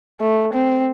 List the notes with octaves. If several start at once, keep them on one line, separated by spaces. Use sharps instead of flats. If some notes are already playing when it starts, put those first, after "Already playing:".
A3
C4